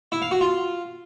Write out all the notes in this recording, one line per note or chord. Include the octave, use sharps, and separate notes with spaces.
E4
F5
F#4
F4